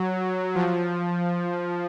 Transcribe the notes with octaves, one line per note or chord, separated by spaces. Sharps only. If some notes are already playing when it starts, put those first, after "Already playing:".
Already playing: F#3
F3